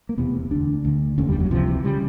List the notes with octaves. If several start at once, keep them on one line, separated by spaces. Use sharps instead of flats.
A#3
E1 E2 C3 B3
D2 D3 D4
D2 D3
F1 D#2 D3 C#4
G3
F#3
C#2 C3 F3
E3
C#3 G3